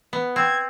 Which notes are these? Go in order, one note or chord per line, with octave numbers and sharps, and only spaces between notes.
B3
C4 G#6